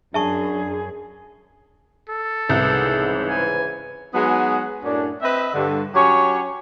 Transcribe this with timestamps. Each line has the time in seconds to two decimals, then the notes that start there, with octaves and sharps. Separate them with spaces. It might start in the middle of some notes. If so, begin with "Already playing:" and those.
0.14 F#2 D4 G#4 E5 A5 C#6
2.10 A4
2.49 C2 G#2 C#3 E3
3.28 G#5
4.14 F#3 G#3 B3 D#4 F#4 G#4
4.84 F#2 A2 C#4 D4
5.22 C4 B4 D#5 E5
5.53 G2 D3
5.95 F#3 C#4 G4 C#5